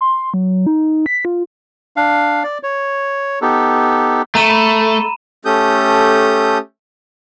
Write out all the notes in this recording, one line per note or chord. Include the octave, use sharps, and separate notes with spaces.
C6
F#3
D#4
B6
F4
D4 F5
D5
C#5
B3 D#4 G4 A4
A3 A#5 D#7 E7
B5
A3 C#4 G4 A4 D#6 G6